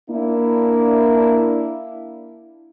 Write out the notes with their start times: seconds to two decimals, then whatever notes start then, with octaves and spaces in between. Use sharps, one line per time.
0.10 A#3 D4 E4